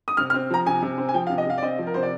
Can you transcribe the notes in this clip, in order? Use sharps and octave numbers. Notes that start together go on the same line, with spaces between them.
D#6
C3 F6
F6
C4
F3 A#5
C3 G#5
C3
C4
G#5
F3 G5
F5
C3
D#5
C3 F5
D5
C4 D#5
F3
A#4
C3 C5
D5